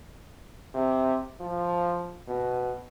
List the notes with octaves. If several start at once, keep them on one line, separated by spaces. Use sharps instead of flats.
C3
F3
B2